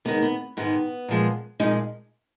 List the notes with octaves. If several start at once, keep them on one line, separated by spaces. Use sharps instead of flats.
D#2 D#3 G#3 B3
B3
G#2 D#3 G#3 B3
A#2 F3 G#3
A#2 F3 G#3 D#4